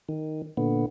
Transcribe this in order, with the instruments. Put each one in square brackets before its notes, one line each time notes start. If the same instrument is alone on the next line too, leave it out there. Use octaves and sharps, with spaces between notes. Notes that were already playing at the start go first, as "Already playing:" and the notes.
[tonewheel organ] D#3
A#2 D3 B3